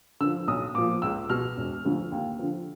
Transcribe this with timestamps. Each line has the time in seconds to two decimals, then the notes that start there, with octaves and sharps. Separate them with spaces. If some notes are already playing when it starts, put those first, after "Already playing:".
0.20 D3 F3 E6
0.48 B1 D#6
0.75 A#2 F3 D6
1.02 C#2 E6
1.30 B2 F6
1.57 E1
1.85 D2 D3 F3
2.12 D#2
2.39 D3 F3